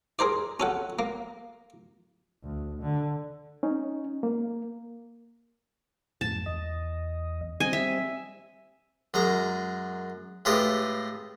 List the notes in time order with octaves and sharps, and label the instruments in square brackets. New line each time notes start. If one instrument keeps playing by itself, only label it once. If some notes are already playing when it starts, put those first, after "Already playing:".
[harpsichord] G#4 A#4 C5 D5
C#4 A4 F#5
A#3
[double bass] D2
D3
[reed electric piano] C#4 D#4
A#3
[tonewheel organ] F2 A2 [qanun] A5
[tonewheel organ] E2 D#5
[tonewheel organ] G3 C4 [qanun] D#5 G#5
[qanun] E5
[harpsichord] F#2 G#3 A#5
A2 G#3 F4 G4 B4 D#5